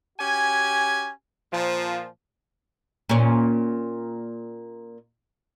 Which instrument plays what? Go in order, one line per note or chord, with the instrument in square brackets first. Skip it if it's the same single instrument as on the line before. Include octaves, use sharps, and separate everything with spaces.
[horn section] C#4 F#4 G4 G#5
A#2 F3
[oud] A#2 C#4